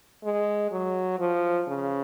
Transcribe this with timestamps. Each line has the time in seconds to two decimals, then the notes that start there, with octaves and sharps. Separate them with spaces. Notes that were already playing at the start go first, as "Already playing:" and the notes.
0.24 G#3
0.72 F#3
1.19 F3
1.68 C#3